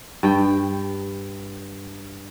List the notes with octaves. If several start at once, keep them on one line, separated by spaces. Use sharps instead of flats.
G2 G5